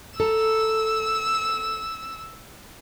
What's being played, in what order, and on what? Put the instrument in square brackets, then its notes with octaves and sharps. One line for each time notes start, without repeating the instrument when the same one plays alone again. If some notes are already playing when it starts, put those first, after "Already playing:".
[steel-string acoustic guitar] A4 A#5 [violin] E6